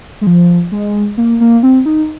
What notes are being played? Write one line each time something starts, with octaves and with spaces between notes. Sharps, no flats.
G#3
F3
G#3
A#3
A#3
C4
D#4